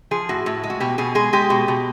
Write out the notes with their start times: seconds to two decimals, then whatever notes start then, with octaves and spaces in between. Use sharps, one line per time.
0.11 F3 G#4
0.29 A2 F#4
0.46 A2
0.63 G#3
0.70 F#4
0.80 B2 G4
0.98 B2 G#4
1.15 G#3 G#4
1.33 G#3 G4
1.50 B2
1.68 B2